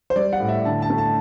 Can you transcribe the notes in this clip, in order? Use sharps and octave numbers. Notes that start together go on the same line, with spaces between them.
C5
G3 D5
F#5
A2
E5
D3 A5
A5
A3
A5